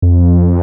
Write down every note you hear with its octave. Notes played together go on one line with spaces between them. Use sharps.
F2